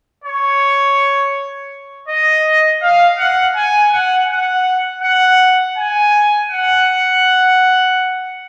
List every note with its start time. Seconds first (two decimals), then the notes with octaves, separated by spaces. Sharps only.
0.24 C#5
2.08 D#5
2.82 F5
3.18 F#5
3.56 G#5
3.93 F#5
4.29 F#5
5.03 F#5
5.77 G#5
6.51 F#5